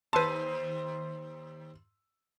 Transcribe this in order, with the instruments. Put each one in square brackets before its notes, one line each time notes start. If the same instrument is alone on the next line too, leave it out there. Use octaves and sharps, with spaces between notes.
[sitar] D#2 C5 [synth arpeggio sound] B4 A5 [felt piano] C6 E6 D#7